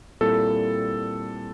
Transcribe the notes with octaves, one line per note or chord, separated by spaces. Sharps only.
A#2 G3 C4 E4 A4